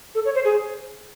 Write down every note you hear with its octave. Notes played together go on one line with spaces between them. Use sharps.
A4
C#5
C5
G#4